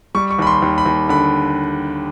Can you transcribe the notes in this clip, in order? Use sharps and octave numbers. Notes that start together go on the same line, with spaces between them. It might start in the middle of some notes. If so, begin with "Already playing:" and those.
G3 C#6
C#6
D#2 B5
C6
D#2
B5
D#2
D3 B5